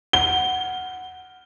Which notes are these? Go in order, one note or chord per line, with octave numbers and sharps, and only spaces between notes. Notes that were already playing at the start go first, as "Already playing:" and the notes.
F#5 G7